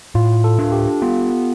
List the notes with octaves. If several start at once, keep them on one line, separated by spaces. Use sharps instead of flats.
A2 F4
A4
D4
G4
B3 F4